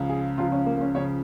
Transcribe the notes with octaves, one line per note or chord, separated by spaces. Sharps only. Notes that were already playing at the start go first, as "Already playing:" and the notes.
Already playing: C#2 C#3 F3
G#4
C#2 C#3 F3 F4
C#4
A#3
A#3
C#4
C#2 C#3 F3 C#5